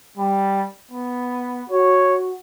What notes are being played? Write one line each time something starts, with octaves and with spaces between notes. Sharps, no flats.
G3
B3
F#4 C#5